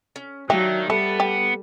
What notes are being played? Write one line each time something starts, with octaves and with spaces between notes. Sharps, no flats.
C#4
D#3 F#3 D4 G4 E5 F5
G3 A3 B3 A4
G4